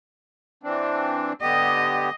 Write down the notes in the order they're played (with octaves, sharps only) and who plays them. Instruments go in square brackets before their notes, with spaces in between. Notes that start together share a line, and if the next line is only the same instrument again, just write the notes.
[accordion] E3 C4 D4
[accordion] D3 B3 G4 [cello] D#5